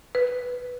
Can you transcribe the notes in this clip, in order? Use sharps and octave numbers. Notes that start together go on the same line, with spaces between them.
B4